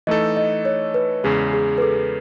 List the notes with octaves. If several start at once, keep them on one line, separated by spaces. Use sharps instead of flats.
E3 A3 D#4 A4 D#5
D#5
C#5
B4
E2 C#3 G#3 G#4
G#4
B4
A4